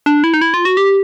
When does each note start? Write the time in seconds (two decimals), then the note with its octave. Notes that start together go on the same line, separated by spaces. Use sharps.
0.06 D4
0.24 E4
0.34 D#4
0.41 E4
0.54 F4
0.65 F#4
0.77 G4